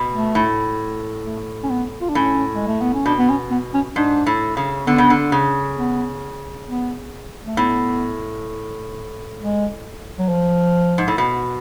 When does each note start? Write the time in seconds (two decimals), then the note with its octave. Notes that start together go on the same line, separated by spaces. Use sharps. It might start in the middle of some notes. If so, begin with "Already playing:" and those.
Already playing: B2
0.12 A3
0.35 A2
1.25 A3
1.63 C#4
1.70 B3
2.01 F4
2.09 D4
2.15 A2 C#4
2.55 G#3
2.67 A3
2.81 B3
2.94 C#4
3.06 B2 D4
3.18 B3
3.29 C#4
3.51 B3
3.74 C#4
3.96 G#2 D4
4.26 A2
4.57 C#3
4.87 D3 B3
4.98 C#3
5.10 D3
5.32 C#3
5.77 B3
6.68 B3
7.47 A3
7.57 A2 B3
9.39 G#3
10.19 F#3
10.28 F3
10.98 G#2
11.08 A2
11.18 B2